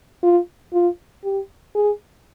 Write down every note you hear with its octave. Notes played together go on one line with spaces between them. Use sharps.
F4
F4
G4
G#4